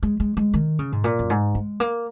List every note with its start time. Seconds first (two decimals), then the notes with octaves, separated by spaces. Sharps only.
0.03 G#3
0.20 G#3
0.37 G#3
0.53 D#3
0.79 C#3
0.92 G#2
1.04 A#2
1.19 F#2
1.30 G#2
1.55 G#3
1.80 A#3